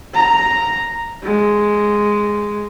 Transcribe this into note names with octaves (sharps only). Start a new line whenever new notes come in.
A#5
G#3